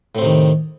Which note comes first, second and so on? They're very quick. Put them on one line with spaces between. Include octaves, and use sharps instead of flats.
A2 C4 C3 D#3